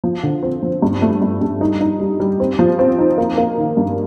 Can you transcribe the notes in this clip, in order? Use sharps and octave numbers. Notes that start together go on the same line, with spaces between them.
F3
D3
C4
F3
G2
A3
G2
G2
D#4
D#4
G3
G3
C4
F3
C4
D#4
A#3
A#3
D#3
G2